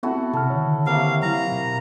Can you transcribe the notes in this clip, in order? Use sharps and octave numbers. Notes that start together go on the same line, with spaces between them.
B3 C4 E4 F#4 A4
C3 A4 A5 F6
D3 D#3 C#5
C3 A#3 F5
F#3 E4 A#5
B2